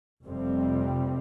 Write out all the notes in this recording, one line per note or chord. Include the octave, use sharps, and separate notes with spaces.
F1 F2 C3 G3 C4